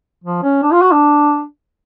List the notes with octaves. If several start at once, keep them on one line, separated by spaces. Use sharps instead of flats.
F3
C#4
D4
F4
F#4
D4